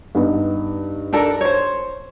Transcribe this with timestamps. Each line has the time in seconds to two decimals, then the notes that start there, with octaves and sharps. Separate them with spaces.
0.15 G2 B3 D#4
1.13 D4 A4 A#4
1.41 C5 C#5